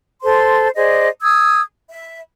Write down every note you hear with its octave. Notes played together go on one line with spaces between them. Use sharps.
A4 C5 C6
G#4 C5 D5 D#5
D#6 E6 G#6
E5